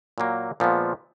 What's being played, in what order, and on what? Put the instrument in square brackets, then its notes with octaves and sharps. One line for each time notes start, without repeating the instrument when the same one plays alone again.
[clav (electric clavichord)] A#2 F#3 A#3
A#2 F3 G#3 B3